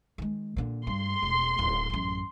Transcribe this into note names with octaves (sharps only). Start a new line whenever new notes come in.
D#3 G#3
A#2 D3
G2 C6
E1
D1
A1 F#2